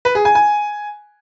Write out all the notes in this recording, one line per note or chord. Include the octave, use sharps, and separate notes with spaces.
B4
G#4
G#5
G#5